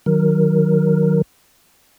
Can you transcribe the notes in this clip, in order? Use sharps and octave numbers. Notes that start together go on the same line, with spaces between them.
D#3 F#3 A#4